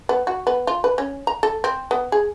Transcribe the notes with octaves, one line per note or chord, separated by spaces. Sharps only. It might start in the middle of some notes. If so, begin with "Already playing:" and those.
B3
F#4
B3
F4
B4
C#4
A#5
A4
C4
B3
G#4